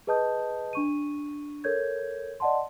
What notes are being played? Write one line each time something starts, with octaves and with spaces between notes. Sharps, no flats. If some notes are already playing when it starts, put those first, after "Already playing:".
G#4 B4 D#5 A5 D#6 G6
D4 C#6 D#7
A4 A#4 C#5 G6 G#6
D5 D#5 F#5 A5 C6